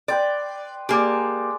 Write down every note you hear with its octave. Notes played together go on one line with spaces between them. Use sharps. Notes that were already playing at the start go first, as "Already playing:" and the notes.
B4 D5 G5 C6
G#3 A#3 G4 D5